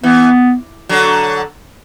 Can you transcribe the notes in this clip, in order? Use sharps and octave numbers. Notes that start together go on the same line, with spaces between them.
E3 B3
D3 F#3